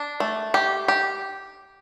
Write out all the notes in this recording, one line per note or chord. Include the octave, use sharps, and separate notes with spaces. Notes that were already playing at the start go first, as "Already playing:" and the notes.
Already playing: D4
A3
G4
G4